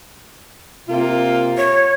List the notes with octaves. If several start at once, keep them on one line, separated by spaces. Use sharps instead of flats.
C3 A#3 F4
C#5